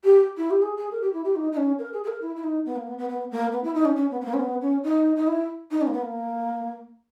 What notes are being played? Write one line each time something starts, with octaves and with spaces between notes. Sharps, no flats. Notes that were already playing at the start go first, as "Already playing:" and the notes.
G4
E4
G4
G#4
G#4
A#4
G4
E4
G4
D#4
D#4
C#4
A#4
G#4
G#4
A#4
E4
E4
D#4
B3
A#3
B3
B3
B3
A#3
B3
E4
D#4
C#4
C#4
B3
B3
A#3
C#4
B3
C#4
D#4
D#4
E4
D#4
C#4
A#3
B3
A#3